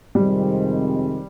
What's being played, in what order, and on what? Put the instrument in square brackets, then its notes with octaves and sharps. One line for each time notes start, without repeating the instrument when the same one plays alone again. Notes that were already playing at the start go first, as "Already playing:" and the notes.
[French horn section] F2 C3 D#3 G#3 C4 [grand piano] G3